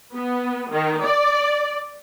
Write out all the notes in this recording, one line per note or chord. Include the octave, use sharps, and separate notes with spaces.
B3
D#3
D5